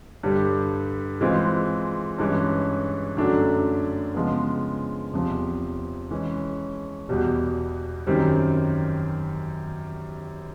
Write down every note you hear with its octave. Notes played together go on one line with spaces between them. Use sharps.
G2 D3 G3
E3 G#3 C4 F4
G2 E3 G#3 C#4
F#2 D3 F#3 A3 D4
C#3 F3 G#3 B3
E2 C3 F3
E3 G#3 C#4
E2 B2 G3
F#2 D#3 G3 C4